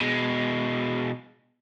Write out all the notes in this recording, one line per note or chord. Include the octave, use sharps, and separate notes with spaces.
B2 G#3